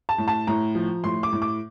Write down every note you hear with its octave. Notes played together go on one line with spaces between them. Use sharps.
A5
A2
A5
A2 A#5
F3
A2 C6
D6
A2
D6